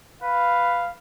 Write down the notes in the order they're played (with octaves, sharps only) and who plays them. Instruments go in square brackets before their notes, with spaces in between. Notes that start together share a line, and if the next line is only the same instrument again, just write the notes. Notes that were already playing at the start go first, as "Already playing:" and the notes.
[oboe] B4 [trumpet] F5